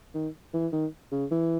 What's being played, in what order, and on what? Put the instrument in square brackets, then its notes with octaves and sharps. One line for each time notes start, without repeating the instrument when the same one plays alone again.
[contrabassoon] D#3
E3
D#3
C#3
E3